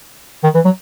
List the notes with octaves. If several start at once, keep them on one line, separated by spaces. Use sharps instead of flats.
D#3
E3
F#3